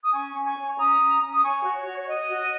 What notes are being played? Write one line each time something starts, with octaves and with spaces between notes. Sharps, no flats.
D#6
C#4 G#5 C#6
C#4
G#5 C#6
C#5
C#4 A#5 D#6
C#4
C#4
D#6
C#5 G#5 C#6
F#4
C#5
F#4
C#5
C#5 D#5
F#4